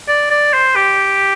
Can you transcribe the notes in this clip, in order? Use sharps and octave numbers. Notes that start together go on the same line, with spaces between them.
D5
D5
C5
G4